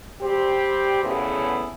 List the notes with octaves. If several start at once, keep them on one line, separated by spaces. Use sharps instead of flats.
G3 C4 G4
E2 A2 C#3 B3 E4